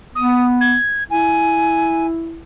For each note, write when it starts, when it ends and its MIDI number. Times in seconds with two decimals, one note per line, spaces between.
0.15 0.75 59
0.15 0.46 87
0.61 1.04 92
1.10 2.41 64
1.10 2.07 80